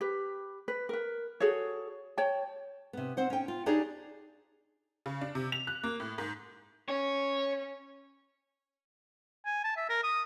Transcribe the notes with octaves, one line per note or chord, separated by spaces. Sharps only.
G4 B4
B4
A#4 B4
F#4 G#4 A4 C#5
C#5 G5 A5
C3 B3
C4 C5 F#5
C#4 G5
F4
D4 D#4 G4 G#4 C#5 D5
C#3
D4
C3
F7
F#6
A#3
A2
G#2
C#4 C#5
G#5
A5
E5
A#4
D#6